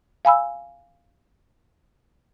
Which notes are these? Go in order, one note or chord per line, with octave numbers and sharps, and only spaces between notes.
F5 G#5 B5 E6